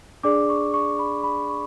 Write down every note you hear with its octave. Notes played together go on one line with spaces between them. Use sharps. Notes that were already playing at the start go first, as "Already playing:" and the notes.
D4 G#4 D5 D6
C#6
C#6
B5
B5
C#6